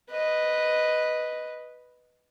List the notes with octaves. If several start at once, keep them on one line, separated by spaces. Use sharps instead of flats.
B4 D#5